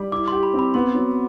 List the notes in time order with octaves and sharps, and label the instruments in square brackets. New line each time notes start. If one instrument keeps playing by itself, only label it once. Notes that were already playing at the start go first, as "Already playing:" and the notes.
Already playing: [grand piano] G3
[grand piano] E4 [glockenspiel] D6
[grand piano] G4 [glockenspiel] C6
[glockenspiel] B5
[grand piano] C4
[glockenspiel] B5
[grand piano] B3 [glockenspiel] C6
[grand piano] F#3